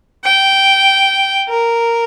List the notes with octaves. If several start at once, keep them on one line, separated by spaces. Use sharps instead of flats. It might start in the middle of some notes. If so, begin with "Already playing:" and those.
G5
A#4